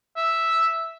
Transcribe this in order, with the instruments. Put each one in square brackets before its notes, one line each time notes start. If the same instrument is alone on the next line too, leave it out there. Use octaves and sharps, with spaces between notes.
[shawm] E5